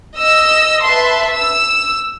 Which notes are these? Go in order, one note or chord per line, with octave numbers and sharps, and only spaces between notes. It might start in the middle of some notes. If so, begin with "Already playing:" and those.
D#5 E6
B4 E5 A5 C6
E6